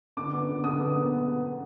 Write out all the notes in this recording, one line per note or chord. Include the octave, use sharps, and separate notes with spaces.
D3 D6
B3
D3
D3 D#6
B3
B3
B3
B3